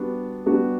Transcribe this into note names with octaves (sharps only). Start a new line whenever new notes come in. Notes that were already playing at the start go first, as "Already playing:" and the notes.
Already playing: G3 B3 D4 F#4
G3 B3 D4 F#4